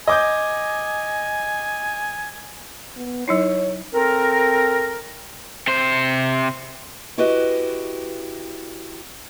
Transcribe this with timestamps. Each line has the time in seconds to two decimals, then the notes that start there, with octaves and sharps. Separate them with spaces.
0.08 D#5 G#5 D6 G6
2.96 B3
3.28 F#3 D#4 E4 C#5
3.94 C4 A4 A#4
5.68 C3 C5
7.18 E4 F#4 G4 B4 D#5